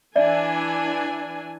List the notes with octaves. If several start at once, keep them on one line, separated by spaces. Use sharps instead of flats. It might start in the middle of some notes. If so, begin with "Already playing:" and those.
E3 D4 D5 E5 G#5